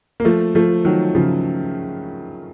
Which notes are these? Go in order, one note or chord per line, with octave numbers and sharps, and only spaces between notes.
A#3
F3 A3
F3 A3
D#3 F#3
C#3 F3